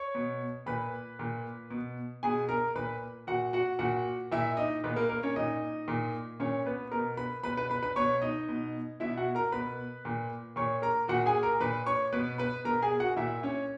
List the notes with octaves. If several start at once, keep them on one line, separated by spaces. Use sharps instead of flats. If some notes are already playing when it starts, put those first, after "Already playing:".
Already playing: C#5 C#6
B2
A#2 B4 B5
A#2
B2
B2 G#4 G#5
A#4 A#5
A#2 B4 B5
A#2 F#4 F#5
F#4 F#5
A#2 F#4 F#5
A#2 E4 E5
D#4 D#5
A#2 B3 B4
A#3 A#4
A#3 A#4
C#4 C#5
A#2 D#4 D#5
A#2
A#2 C#4 C#5
B3 B4
B2 A#4 A#5
B4 B5
B2 B4 B5
B4 B5
B4 B5
B4 B5
B2 C#5 C#6
D#4 D#5
B2
B2 E4 E5
F#4 F#5
A#4 A#5
B2 B4 B5
A#2
A#2 C#5 C#6
A#4 A#5
A#2 F#4 F#5
G#4 G#5
A#4 A#5
A#2 B4 B5
C#5 C#6
B2 B4 B5
B4 B5
B2 A#4 A#5
G#4 G#5
F#4 F#5
A#2 E4 E5
C#4 C#5